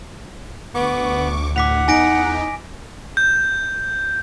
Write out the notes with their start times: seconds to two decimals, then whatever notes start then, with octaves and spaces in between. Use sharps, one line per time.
0.75 D2 B3 C#6 D6
1.56 A2 F#5 D6 B6 F7
1.88 E2 D#4 G#5 A#6 D7
3.17 G6